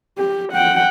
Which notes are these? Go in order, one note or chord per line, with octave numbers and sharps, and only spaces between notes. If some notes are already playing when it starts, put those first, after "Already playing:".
G4
F#5 G5